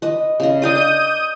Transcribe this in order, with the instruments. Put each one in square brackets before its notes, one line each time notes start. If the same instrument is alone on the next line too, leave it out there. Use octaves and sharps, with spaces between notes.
[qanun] B4 D#5
C#3 D#5
[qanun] D4 A#4 D#5 [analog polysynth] D#6 G6 D#7